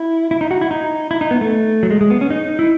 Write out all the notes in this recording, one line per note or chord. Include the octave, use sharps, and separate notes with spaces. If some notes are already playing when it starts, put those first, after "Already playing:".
Already playing: E4
E4
D#4
F#4
E4
D#4
E4
D#4
B3
A3
F#3
G#3
G#3
B3
C#4
D#4
E4